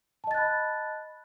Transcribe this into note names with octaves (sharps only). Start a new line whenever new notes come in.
D#5 A5 B5 F#6 A6